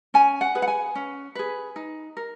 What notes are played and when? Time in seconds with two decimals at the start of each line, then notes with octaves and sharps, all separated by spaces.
0.14 C#4 G#5
0.41 F#5
0.55 G#4 B4
0.62 F#5
0.68 G#5
0.95 C#4
1.35 G#4 B4
1.76 D#4
2.17 A#4